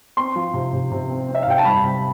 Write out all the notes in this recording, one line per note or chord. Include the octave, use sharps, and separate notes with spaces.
C4 C6
F3
C3
C3
C3
C4
C4
E5
F5
C3 G5
A5
G3 B5
C3